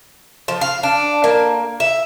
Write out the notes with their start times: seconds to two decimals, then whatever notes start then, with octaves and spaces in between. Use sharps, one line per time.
0.48 F3
0.61 F5
0.83 D4
1.24 A#3
1.80 E5